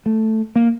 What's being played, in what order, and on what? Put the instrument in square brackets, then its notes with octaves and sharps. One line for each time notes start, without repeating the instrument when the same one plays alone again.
[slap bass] A3
A#3